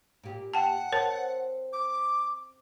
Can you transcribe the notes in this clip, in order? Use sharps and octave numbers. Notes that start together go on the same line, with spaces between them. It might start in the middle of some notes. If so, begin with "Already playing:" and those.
A#2 G4
F#5 G5 A5
C4 A#4 C#5 A5
D6